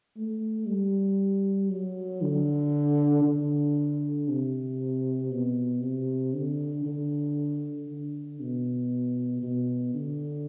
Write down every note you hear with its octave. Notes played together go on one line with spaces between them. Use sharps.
A3
G3
F#3
D3
D3
C3
B2
C3
D3
D3
D3
B2
B2
D3